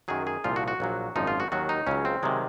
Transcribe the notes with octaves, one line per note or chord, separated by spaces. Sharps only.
F#2 D#3 F#3 G#4
G#4
C2 A#2 F3 F4
F#4
F#4
A#1 A#2 F#3
G#1 F#2 F3 D#4
F4
F#4
D#2 D#3 F#3 F#4
D#4
C#2 C#3 F#3 C#4
C4
C3 D#3 F#3 G#3